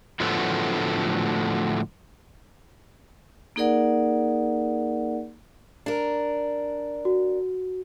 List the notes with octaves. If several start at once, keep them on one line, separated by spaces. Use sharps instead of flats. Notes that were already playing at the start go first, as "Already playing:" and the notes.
A2 D3 F3 F#3 A3 B3
A#3 D#4 G#4 A#4 D5 F#5
D4 A#4
F#4